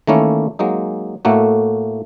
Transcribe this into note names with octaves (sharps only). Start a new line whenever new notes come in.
D#3 E3 A3 A#3 C#4 E4
F#3 G#3 A#3 D#4
A2 A3 A#3 F#4